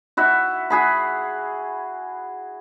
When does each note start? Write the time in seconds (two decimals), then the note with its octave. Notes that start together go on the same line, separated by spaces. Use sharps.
0.17 E4 F#4 E5
0.70 F#4 G#4 B5